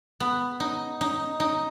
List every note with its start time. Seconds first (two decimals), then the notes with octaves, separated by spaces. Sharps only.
0.20 B3
0.60 D#4
1.01 D#4
1.40 D#4